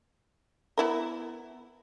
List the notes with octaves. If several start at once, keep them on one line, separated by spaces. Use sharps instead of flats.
B3 E4 A#4